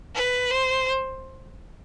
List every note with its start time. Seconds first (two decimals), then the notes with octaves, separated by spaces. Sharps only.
0.15 B4
0.51 C5